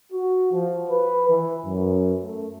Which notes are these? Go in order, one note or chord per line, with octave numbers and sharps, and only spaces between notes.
F#4
F3
B4
E3
F#2
A3